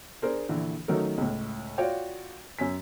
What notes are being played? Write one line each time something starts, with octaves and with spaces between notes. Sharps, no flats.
D4 G#4 A#4 C5
A#1 D3 E3
D#3 F#3 A3 C#4 D#4 A#4
C#2 A2
F4 F#4 C#5 D5 F5 G5
F#2 C#4 G#5 B6